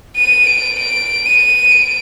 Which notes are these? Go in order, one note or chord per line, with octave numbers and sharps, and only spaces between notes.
D#7
D7
D7
D#7
D7